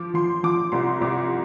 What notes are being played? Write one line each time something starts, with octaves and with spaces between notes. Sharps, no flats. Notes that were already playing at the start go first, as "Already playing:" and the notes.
Already playing: F3 D6
F3 C6
F3 D6
C2 C6
C2 D6